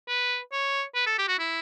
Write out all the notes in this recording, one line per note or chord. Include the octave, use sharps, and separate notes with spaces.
B4
C#5
B4
A4
G4
F#4
E4